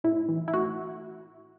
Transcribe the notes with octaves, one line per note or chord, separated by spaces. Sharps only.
A2 E4
E3
E4
A2 F#4